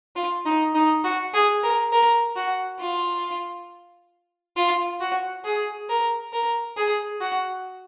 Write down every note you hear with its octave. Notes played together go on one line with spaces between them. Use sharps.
F4
D#4
D#4
F#4
G#4
A#4
A#4
F#4
F4
F4
F#4
G#4
A#4
A#4
G#4
F#4